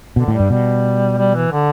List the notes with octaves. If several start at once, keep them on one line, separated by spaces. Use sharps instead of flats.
B2 D3
A2
G3
G2
B2 G3
G3
E3
D3